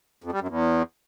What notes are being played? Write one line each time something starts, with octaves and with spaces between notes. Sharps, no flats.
F2
G3
F#2
E2